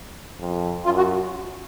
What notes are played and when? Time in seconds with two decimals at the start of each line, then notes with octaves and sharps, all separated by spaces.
0.39 F2
0.85 F#2 F4
0.97 F#4